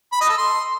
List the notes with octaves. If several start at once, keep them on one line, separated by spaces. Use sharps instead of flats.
B5
D#5
A4
C6